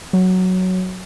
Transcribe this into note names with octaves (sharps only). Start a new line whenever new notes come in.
F#3